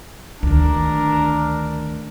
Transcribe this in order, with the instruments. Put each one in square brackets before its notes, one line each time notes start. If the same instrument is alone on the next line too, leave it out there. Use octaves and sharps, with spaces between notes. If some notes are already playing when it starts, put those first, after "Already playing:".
[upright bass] D2 D#3 [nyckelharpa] D4 A#4